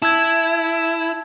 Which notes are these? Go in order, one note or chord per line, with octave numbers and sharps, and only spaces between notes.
E4 A5 E6 G#6